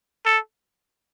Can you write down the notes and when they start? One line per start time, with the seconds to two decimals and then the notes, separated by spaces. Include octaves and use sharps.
0.26 A4